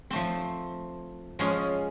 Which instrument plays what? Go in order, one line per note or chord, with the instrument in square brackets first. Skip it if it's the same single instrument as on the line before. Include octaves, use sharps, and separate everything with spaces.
[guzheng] F3 A3 C4
F3 G#3 C#4 F4 G#4